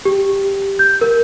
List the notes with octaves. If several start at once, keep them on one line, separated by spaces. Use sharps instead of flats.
G4
G6
A#4